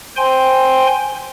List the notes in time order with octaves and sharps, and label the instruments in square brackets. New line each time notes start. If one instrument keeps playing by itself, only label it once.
[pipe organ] C5 G5 G#5 C6